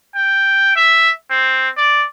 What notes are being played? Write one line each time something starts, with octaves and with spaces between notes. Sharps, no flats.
G5
E5
C4
D5